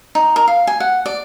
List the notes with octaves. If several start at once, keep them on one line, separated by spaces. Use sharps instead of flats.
D#4
A#4
F5
G#5
F#5
D5